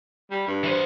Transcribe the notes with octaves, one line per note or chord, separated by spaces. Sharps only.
G3
G2
E3 C5